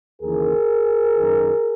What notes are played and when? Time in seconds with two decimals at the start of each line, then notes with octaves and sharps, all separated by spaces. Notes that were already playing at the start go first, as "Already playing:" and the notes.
0.21 D#2 C#3 E3 G#4 A#4
1.17 F#2 D#3